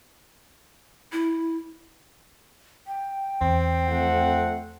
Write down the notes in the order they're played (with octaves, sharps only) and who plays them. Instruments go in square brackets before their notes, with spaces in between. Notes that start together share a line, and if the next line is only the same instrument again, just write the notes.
[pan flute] E4
[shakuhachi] G5
[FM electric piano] E2 [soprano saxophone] C4
[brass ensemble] F2 A3 F#5